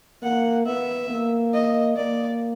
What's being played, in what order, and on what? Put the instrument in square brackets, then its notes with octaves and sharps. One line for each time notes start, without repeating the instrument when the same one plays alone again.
[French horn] A#3 [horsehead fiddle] F#5
[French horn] B3 [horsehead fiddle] E5
[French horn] A#3
[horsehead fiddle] D#5
[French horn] A#3 [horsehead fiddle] D5